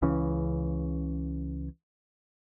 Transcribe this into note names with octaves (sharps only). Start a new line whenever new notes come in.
C#2 C#3 E3 C#4